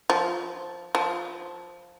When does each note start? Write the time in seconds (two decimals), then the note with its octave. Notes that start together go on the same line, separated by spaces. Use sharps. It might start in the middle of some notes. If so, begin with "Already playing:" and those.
0.10 F3
0.95 F3